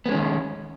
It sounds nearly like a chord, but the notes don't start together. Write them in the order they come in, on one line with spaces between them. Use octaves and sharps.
B3 G#3 C#4 D#3